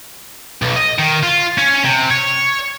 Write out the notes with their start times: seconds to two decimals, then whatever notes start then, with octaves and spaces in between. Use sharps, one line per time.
0.62 B1
0.76 D#5
0.99 D#3
1.23 F4
1.58 C#4
1.84 C3
2.10 C#5